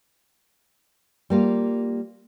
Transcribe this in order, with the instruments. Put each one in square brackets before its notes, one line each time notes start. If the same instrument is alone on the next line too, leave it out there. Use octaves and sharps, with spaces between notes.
[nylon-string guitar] G3 A#3 F4